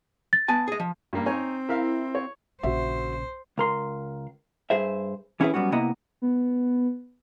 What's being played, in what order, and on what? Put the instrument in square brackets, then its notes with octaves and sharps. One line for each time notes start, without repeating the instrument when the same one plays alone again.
[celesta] A6
[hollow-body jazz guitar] B3 G#5 A5
G#4 D#5
F3
[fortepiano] G2 A#3
[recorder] C4 [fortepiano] D#4 C#5 G#5
[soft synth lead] E4 [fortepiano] A#4 E5 F5
[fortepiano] C#5
[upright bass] A#1 C#3 [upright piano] F#4 E5 [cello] C5
[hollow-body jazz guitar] C#2 A#4 C6
G2 G#4 C5 E5
E3 C#4 E4 F#4 G#4 B4
F#3 G3 B3 C#4 F#4
C3 A#3 B3 E4 D#5 A#5
[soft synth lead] B3